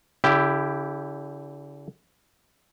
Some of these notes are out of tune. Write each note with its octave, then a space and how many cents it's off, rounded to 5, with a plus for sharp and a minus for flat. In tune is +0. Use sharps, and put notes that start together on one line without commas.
D3 -45 E4 +5 G4 +0